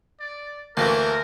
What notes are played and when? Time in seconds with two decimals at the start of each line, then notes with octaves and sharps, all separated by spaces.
0.20 D5
0.77 D2 E3 A3 A#3 A#4